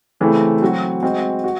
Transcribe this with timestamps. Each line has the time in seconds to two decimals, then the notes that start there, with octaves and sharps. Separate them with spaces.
0.20 C#3 E3 A3 C4
0.62 F#3 C4 F#4
1.02 G#3 C4 F#4
1.44 F#4